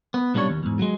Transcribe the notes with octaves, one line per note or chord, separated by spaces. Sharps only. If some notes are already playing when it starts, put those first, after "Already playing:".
B3
B1 A#2 G3 D4 G4 C#5
D#2
E2 G#2
F#3 G#3